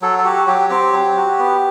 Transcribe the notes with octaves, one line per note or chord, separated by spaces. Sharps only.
F#3 A4
A4
F#4 G4
F#3 G4
C4 G4
F#3
F#4
B3